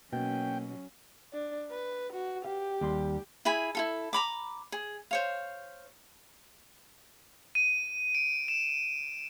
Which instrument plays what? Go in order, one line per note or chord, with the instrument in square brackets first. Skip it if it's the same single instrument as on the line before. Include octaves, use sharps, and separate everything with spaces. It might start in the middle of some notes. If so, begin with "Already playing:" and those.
[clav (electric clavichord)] B2 [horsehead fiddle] F#3 C#4 [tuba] A#3 [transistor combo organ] G5
[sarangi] D4
B4
F#4
[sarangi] G4 [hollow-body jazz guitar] F5
[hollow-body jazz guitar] D#2 G3 C6
[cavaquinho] E4 G#4 G#5 B5
E4 F4 A4
A#5 B5 D6
G#4
C5 C#5 F5
[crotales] D#7
D7
E7